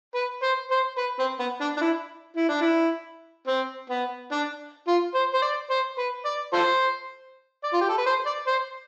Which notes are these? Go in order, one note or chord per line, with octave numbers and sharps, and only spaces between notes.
B4
C5
C5
B4
C4
B3
D4
D4
E4
E4
D4
E4
C4
B3
D4
F4
C5
C5
D5
C5
B4
D5
F4 A4 C5
D5
F4
G4
A4
B4
C5
D5
C5